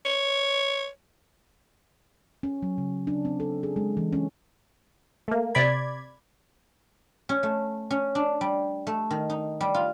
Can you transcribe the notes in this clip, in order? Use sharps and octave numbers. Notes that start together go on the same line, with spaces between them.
C#5
C#4
F#3
C#3
D4
C4
A4
G#4
G#3
E3
C#4
A3 A#3
C3 D5 B5 G#6
C#4
A3
C#4
D4
G3
A3
D#3
D#4
G3
F4